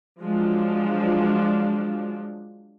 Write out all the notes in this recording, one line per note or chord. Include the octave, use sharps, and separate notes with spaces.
F3 F#3 G#3 D4 F4